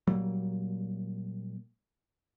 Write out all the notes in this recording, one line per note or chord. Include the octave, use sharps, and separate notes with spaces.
A#2 F#3 G3 A#3